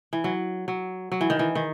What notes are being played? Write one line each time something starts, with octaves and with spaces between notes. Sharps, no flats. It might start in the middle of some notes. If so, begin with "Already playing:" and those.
E3
F#3
F#3
F#3
E3
D#3
E3
D#3